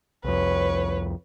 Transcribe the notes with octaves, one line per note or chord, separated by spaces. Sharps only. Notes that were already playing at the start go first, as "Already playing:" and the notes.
C2 F2 B4 C#5